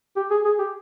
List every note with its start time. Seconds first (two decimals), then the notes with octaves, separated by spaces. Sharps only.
0.16 G4
0.31 G#4
0.45 G#4
0.59 G4